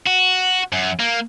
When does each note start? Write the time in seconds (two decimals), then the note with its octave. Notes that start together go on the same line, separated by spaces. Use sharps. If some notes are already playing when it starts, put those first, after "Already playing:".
0.07 F#4
0.73 F#2
1.00 A#3